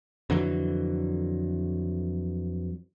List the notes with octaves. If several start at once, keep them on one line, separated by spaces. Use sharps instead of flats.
F2 D3 E3 F#3